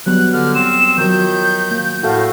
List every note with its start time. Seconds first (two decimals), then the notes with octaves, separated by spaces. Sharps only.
0.06 F#3 G3 B3 F#6
0.33 D3 F6
0.55 C4 E7
0.98 D#3 F3 F#3 G6
1.71 A#3
2.03 A2 F#4 A4 F5